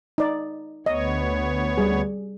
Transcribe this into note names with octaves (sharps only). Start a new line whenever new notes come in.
D#4 D5
D2 B3 C#5 D#5
G3 G#4